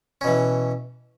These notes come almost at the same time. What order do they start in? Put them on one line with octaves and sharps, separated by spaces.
C#4 B2 E3